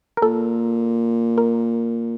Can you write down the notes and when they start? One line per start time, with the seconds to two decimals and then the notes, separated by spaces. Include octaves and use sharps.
0.17 A#4
0.22 A#2 A4
1.38 A#4